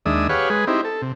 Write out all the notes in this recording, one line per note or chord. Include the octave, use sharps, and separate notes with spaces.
D#2 G#3 D4 E5 D#6
G4 G#4 B4 C#5 F5 F#5
G#3 G#4 B4
C4 D#4 E4 G4
A4
C3